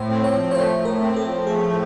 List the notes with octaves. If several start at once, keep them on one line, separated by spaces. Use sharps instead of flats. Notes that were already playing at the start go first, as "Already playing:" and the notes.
Already playing: A2 C5
C4
C#5
F3
C#5
A3 C5
A2
A#4
C4
A4
F3
A3 G#4
A2